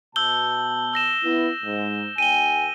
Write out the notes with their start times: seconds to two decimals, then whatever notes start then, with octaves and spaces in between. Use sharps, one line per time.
0.16 B2 A5 E6 G6 G7
0.93 E6 A#6 E7
1.24 B3 E4
1.63 G#2
2.18 D#2 G5 G#5 D#7 G7